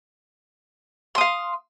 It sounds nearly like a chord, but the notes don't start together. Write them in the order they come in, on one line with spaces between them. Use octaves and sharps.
C6 D#6 F5